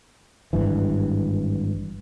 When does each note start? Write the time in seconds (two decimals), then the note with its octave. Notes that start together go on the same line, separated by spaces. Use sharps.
0.53 G#1 G2 E3